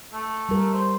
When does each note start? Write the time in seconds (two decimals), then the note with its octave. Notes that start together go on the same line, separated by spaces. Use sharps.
0.13 A3
0.49 G3 A#4
0.74 C5